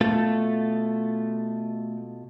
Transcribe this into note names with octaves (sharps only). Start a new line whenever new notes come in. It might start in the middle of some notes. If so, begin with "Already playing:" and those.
B2 A3 F4 A4